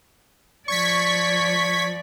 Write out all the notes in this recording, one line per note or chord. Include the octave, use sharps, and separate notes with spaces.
F3 D5 C#6 G#6 B6